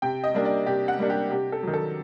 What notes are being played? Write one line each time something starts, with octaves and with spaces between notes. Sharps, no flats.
C3 G5
D#5
G3 A#3 D4
D5
C3 G4
F#5
G3 A#3 D4
G4
C3 G4
A4
D#3 F#3
A4